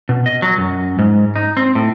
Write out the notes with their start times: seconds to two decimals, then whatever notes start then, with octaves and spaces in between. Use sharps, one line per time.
0.09 B2
0.26 D#5
0.42 F#3
0.58 F#2
0.99 G#2
1.36 D#4
1.57 C4
1.75 A2